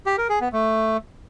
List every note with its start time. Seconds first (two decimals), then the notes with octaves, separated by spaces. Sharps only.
0.06 G4
0.18 A#4
0.29 G#4
0.41 B3
0.53 A3